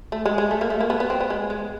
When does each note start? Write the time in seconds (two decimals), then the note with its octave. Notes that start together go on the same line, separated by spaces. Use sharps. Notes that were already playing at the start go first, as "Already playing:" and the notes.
0.12 A3
0.26 G#3
0.38 G#3
0.51 A3
0.61 A#3
0.70 A3
0.80 A#3
0.90 B3
1.00 B3
1.10 C4
1.20 B3
1.30 G#3
1.50 G#3